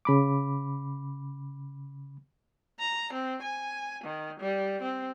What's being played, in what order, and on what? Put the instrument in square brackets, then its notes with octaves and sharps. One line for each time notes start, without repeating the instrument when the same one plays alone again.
[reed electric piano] C#3 B5 D6
[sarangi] A#5
C4
G#5
D#3
G3
C4